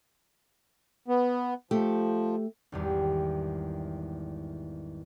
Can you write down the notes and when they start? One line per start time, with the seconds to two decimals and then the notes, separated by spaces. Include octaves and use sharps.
1.08 B3
1.71 F3 A3 G4
2.72 G#1 E2 G3